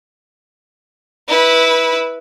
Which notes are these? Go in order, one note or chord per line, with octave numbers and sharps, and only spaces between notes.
E4 B4